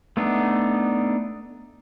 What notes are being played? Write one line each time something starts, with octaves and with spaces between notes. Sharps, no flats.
A3 B3 D4 D#4